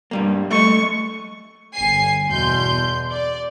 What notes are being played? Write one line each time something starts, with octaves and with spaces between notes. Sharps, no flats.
G2 G3 A#3
A3 D#5 C#6
G1 G#5 C7
E2 B2 C6 G6
D5